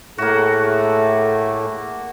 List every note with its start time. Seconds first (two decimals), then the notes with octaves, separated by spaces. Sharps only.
0.18 A2 A3 A#3 F#4 G#4